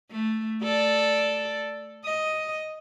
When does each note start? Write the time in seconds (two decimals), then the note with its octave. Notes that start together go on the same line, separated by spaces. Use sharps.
0.11 A3
0.63 A4 D5
2.05 D#5